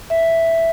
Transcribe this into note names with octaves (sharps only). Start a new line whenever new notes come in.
E5